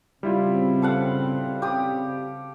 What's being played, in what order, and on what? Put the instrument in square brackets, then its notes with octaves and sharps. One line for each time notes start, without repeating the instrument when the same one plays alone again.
[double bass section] C#3 C4 [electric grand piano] G3 E4 F4
[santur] A4 F5 F#5
G4 D#6